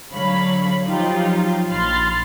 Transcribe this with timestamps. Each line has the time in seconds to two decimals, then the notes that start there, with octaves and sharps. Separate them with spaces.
0.11 D3 F#3 C#5 F5 B5
0.87 F3 F#3 D#4 F4 G4
1.69 A#1 B5 C6 F6 A6